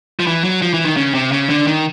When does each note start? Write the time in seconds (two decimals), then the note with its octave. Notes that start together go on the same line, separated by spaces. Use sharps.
0.19 F3
0.27 E3
0.44 F#3
0.62 F3
0.74 E3
0.85 D#3
0.97 C#3
1.14 C3
1.32 C#3
1.49 D3
1.67 D#3